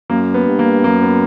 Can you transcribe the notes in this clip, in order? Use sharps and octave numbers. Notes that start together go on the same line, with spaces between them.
F#2 A#3
B3
G2
A#3
F#2 A#3
B3